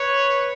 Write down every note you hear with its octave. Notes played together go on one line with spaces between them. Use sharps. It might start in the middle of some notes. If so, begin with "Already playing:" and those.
Already playing: B4 C#5